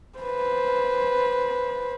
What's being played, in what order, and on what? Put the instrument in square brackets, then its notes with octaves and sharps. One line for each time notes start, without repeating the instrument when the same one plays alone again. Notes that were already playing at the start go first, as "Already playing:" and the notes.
[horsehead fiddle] B4 C5